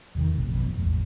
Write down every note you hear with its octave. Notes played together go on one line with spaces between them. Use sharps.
E2 C3 D#3
F1 A#1 A2 C3
A#1 B2
F2 G#2
D#1 A1 E2 A2